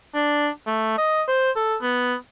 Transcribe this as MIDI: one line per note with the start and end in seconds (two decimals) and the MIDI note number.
0.15 0.49 62
0.67 0.96 57
0.98 1.22 75
1.28 1.51 72
1.56 1.76 69
1.82 2.14 59